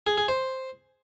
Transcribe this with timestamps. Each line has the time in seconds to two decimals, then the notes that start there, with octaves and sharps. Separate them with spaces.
0.07 G#4
0.17 G#4
0.28 C5